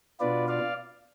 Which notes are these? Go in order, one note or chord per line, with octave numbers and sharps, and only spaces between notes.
B2 B3 D4 F4 B4 D5
D5 F5